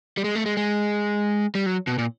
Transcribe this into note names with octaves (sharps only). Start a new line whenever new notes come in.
G3
G#3
A3
G#3
G#3
G3
F#3
B2
A#2